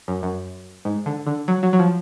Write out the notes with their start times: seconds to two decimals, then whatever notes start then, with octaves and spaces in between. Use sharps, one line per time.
0.08 F#2
0.23 F#2
0.85 G#2
1.06 D3
1.27 D3
1.48 F#3
1.63 F#3
1.73 F#3
1.79 F3